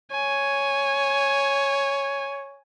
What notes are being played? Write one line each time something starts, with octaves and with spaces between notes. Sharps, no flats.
C#5 G#5